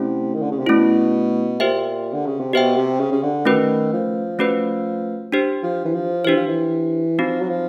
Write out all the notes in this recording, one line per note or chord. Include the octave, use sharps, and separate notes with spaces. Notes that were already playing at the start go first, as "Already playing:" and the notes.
Already playing: C3 A3 C#4 E4
D#3
D3
C#3
C3
B2 A3 C#4 E4
A#2 G4 C5 E5 G5
D3
C#3
C3
B2 G4 C5 E5 G5
C3
C#3
C#3
D3
D#3 A3 C#4 F#4 B4
F3
A3 C#4 F#4 B4
D4 G4 C5
F3
E3
F3
E3 D4 G4 C5
F3
E3
F3 C4 D#4 F#4
F#3
F3